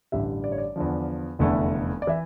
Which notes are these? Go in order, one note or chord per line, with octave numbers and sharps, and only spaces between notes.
A1 G2 D3 G3 E5
D5
C#5
D5
E2 D3 F3
F1 E2 D3 A3 E4
D5
E3 E5